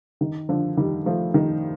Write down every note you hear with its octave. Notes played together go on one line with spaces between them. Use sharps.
D#3
D3 F3
D#3 G3
F3 A3
D#3